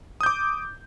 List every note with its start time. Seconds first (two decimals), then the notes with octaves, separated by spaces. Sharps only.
0.21 D#6
0.23 G6
0.26 D6